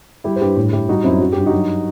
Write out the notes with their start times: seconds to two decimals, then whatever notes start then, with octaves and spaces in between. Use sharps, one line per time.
0.24 G3 E4 G4
0.36 C5
0.41 G2 G4 B4
0.57 A2
0.73 A2 E4 G4
0.89 G3 D#4 F#4
1.04 F#2 C4 E4
1.20 F#3 F#4
1.32 G2 G4
1.46 D#4 F#4
1.53 F#3